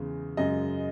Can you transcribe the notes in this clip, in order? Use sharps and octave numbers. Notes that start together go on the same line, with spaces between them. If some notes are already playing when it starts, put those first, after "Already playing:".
Already playing: E2 C#3 G#3
F#2 C#3 G#3 D#5